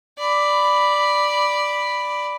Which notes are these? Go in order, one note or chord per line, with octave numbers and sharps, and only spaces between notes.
D5 B5